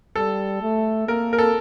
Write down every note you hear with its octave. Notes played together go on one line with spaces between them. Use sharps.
G3 A4
A3
A#3 A#4
A#4
A4